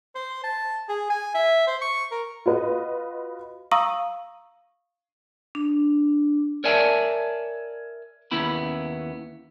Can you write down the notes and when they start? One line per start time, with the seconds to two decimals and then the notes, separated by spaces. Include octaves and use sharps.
0.15 C5
0.44 A5
0.89 G#4
1.10 G#5
1.35 E5
1.67 C5
1.81 C#6
2.11 A#4
2.46 F4 F#4 B4 D#5
3.71 F5 A#5 C#6 D#6 E6
5.55 D4
6.64 A#4 C#5 D5 E5 G#5 A5
8.31 D#2 B3 C#4 E4 B5